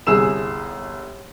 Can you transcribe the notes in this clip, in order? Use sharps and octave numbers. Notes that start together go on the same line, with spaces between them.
G1 C2 G#4 E6 E7